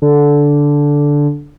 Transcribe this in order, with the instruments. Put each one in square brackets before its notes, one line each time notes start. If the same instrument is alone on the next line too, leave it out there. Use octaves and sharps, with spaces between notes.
[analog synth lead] D3